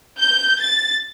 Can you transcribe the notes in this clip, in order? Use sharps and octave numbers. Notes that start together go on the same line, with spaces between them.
G6
A6